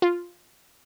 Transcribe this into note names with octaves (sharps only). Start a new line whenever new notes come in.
F4